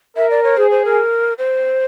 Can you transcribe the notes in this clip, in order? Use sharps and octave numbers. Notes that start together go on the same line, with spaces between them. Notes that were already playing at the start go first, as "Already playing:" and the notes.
A#4 E5
D5
C#5
G#4 C5
C5
A#4
C5